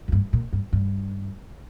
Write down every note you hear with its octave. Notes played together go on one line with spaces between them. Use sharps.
F2
G2
A#2
G2
G2